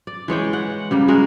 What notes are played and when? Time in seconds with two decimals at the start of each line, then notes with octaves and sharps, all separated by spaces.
0.07 D5
0.28 E3 G#3 C#5 G5
0.53 F#5
0.91 C#3 G3 A#3
1.08 G#3 F#4 G#4 A#4